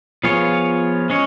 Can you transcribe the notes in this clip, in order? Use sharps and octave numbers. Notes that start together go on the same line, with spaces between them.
F3 B3 F4 G#4 C#5
G#3 C#4 G#4 C#5